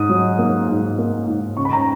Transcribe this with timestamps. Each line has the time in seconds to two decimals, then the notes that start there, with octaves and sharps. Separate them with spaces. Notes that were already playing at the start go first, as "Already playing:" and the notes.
Already playing: G#2 D#6
0.09 F#3
0.39 A#3
0.69 G#2
0.99 A#3
1.27 G#2
1.57 C#3 C#6
1.65 B5
1.73 A#5